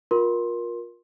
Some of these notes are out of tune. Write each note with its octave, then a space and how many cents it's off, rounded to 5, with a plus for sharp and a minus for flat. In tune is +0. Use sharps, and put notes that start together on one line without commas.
F4 +30 A#4 +20 C6 +15